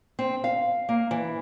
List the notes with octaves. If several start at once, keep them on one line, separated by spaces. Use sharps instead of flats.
C4
F5
A#3
E3